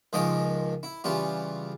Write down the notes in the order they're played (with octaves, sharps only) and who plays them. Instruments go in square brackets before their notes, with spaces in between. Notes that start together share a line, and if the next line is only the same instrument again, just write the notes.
[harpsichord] C#2 D#3 F3 G#3 D#5 D6
E4
C#3 E3 G3 F4